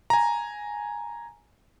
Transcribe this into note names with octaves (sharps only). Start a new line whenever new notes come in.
G#5 A#5